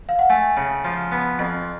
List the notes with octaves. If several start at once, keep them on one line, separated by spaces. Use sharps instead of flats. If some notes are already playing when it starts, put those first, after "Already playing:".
F5
F#5
A3 G#5
C#3
F3
B3
F2